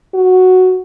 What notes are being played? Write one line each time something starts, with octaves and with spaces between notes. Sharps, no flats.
F#4